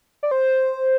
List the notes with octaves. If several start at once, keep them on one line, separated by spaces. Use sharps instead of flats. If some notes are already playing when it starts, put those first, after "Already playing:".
D5
C5